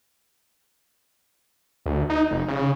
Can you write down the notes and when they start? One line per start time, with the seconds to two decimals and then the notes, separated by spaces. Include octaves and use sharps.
1.86 D2
2.10 D#4
2.31 F1
2.48 C#3